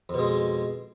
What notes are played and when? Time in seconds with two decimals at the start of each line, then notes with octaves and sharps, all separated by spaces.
0.09 F2
0.14 B2
0.19 G#3